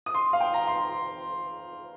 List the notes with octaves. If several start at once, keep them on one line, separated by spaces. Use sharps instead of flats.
D#6
C6
F5
G5
A#5
C6